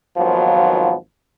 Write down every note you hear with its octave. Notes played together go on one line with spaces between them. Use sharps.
G#1 D#2 F3 F#3 B3 F4